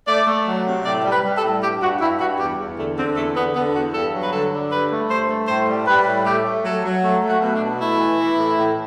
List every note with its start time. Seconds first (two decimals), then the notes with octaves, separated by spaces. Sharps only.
0.07 A3 D5
0.27 A3
0.47 F#3
0.66 C3
0.85 A2 D5
1.04 G3
1.11 B4
1.23 G3
1.36 A4
1.43 A2
1.62 G2 G4
1.81 G2 F#4
2.01 G2 E4
2.20 G2 F#4
2.39 E2 G4
2.58 E2
2.78 D3 A3
2.97 D3 C4
3.16 E2 A3
3.36 D3 B3
3.55 D3 B3
3.74 E2 F#4
3.94 G2 A4
4.13 F#3
4.21 B4
4.33 D3 A4
4.53 D3
4.71 G2 B4
4.90 A3
5.09 G2 C5
5.30 A3
5.48 A2 C5
5.68 G3
5.87 G3 B4
6.06 A2
6.25 A3 G4
6.45 A3
6.64 F#3 A4
6.84 F#3
7.04 A3
7.22 A3
7.28 F#4
7.42 B2
7.55 D4
7.60 B2
7.80 A3 E4
7.99 E3
8.20 E3
8.38 A2
8.57 A2